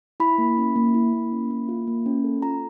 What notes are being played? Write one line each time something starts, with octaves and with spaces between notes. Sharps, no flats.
E4 B5
A#3
C#4
A#3
E4
A#3
C#4
A#3
F4
A#3
C#4
A4
F4 A#5